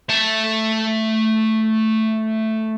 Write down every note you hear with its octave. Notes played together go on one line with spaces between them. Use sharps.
A3 A5